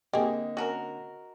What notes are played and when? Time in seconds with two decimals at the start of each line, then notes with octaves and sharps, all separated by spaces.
0.13 D3 A#3 C4 G4 G#4 D#5
0.57 C#4 F#4 G#4 A#4